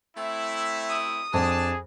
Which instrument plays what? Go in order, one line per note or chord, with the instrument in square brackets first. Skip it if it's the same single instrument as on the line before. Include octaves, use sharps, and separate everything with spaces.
[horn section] A3 C4 E4 [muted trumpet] E5
[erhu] D#6
[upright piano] F2 [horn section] D4 D5 A5 [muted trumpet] G#4